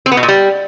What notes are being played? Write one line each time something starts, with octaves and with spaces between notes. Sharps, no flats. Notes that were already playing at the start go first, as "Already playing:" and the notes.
C4
B3
B2
A#2
G3